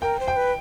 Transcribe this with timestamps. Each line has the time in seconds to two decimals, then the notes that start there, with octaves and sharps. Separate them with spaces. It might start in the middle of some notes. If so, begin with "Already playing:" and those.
0.02 A#4 G5
0.19 C5
0.28 G5
0.36 B4